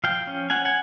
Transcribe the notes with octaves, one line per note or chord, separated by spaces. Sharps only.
F3 F5 G5
C#4
C#4 F#5 G#5
F#5 G#5